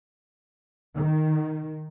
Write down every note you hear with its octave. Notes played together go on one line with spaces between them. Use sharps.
D#3